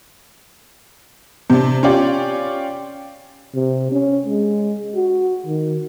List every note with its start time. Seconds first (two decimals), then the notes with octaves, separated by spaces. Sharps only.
1.50 C3 D4
1.83 C#4 F4 G4 D5
3.54 C3
3.91 C#4
4.25 G#3
4.95 F#4
5.47 D#3